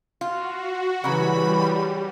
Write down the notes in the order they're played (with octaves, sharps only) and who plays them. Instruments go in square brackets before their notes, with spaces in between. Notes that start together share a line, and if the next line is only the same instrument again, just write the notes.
[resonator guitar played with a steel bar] F4 [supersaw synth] F#4
[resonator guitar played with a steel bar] C#3 F#3 [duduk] E3 [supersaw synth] G3 [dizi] B5